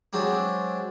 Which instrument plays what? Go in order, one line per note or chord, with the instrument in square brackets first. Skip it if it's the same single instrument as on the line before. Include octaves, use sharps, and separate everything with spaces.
[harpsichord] F#3 G#3 C4 D4